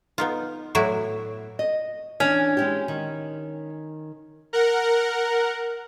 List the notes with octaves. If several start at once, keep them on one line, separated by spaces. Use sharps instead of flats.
B3 D#4 F4
A2 F#3 E4 F#4 D5 E5
D#5
E3 C#4 D4
G#3 E4 G4
D#3
A#4 F#5